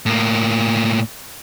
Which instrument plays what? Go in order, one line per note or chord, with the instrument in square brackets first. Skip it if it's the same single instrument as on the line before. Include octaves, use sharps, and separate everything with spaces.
[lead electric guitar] A2 A#3